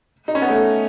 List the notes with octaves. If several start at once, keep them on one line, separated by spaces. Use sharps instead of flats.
D#4
C#4
B3
A3